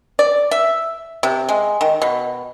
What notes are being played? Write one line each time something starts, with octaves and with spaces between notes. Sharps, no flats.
D5
E5
C3
G#3
D#3
B2